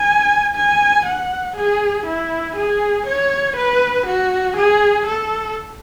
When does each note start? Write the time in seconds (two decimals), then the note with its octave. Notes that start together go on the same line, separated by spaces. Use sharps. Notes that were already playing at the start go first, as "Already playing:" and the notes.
Already playing: G#5
0.56 G#5
1.06 F#5
1.57 G#4
2.06 E4
2.56 G#4
3.07 C#5
3.57 B4
4.07 F#4
4.57 G#4
5.06 A4